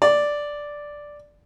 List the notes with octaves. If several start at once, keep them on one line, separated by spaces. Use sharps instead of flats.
D5